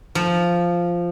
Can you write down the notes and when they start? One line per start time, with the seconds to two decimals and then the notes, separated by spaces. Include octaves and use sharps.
0.15 F3